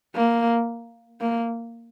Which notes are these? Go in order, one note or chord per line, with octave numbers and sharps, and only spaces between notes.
A#3
A#3